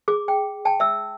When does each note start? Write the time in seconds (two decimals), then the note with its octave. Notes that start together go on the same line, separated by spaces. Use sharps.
0.08 G#4 D6
0.28 G5
0.65 G5 A5
0.80 E5 E6